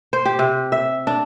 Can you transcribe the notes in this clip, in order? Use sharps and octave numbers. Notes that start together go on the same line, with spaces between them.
C5
G4
C3
E5
D4